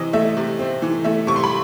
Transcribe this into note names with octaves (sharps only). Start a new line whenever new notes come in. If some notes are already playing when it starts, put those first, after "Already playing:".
Already playing: C3 E3 C4 D#5
A3 E5
C3
C4
E3
A3 E5
C3 C#6
C6
B5